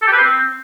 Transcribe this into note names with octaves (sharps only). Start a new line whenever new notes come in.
A4
G4
B4
C5
C4